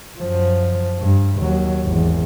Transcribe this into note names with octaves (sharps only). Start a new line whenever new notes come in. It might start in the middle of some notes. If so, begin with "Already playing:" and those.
F#2 F3
G2
D#2 F#3
G#1 E2